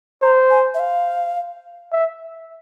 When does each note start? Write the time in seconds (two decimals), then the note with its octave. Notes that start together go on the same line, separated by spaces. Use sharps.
0.22 C5 A#5
0.50 G#5
0.74 E5
0.79 F5
1.92 E5